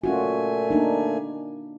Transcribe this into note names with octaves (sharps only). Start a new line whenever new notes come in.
A#2 A3 C#4 F4 F#4 G#5
A#3 D4 D#4